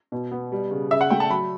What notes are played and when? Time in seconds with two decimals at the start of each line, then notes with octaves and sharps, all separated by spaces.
0.12 B2
0.32 B3
0.52 G3
0.71 C#3
0.91 C#3 E5
1.01 F#5
1.11 A3 G5
1.20 A5
1.30 F#3 B5